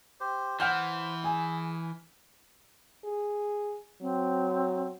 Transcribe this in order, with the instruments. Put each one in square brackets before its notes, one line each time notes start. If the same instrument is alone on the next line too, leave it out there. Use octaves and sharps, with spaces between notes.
[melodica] G4 C5
[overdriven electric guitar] E3 [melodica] C5 [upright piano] F#5 F6 G6
[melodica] G#4 [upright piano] G#5
[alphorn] G#4
[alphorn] F#3 [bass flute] C4